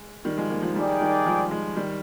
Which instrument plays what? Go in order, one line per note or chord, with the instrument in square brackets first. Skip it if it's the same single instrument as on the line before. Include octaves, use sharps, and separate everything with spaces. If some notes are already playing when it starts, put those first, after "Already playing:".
Already playing: [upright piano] G#3
D#3 G3
F3 G#3
G3 A#3
F3 G#3
[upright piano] D#3 G3 [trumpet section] D#4 G#4 D5 G5
[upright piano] D#3 G3
F3 G#3
F3 G#3
D#3 G3